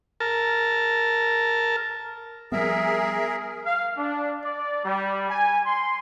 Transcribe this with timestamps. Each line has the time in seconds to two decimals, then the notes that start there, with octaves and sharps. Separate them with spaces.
0.20 A#4 A5
2.52 F3 G3 B3 G#4 A#4 E5
3.65 F5
3.97 D4
4.44 D5
4.85 G3
5.30 G#5
5.66 C6